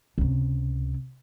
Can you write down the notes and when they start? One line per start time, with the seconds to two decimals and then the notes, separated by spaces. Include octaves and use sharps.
0.18 C#2 C3